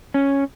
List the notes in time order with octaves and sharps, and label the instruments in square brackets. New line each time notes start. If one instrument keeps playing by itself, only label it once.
[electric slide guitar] C#4